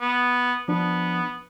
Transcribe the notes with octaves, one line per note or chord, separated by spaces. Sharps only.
B3
F3 B3 D4